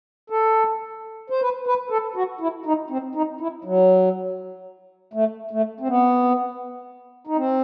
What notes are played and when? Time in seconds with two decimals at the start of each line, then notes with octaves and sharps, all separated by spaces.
0.30 A4
1.30 C5
1.42 B4
1.67 B4
1.90 A4
2.16 F#4
2.40 E4
2.66 D#4
2.90 C4
3.15 D#4
3.40 E4
3.64 F#3
5.13 A3
5.51 A3
5.80 C4
5.88 B3
7.27 D#4
7.37 C4